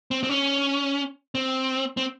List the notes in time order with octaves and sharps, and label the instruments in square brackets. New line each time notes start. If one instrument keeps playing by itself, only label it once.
[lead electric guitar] C4
C4
C#4
C4
C4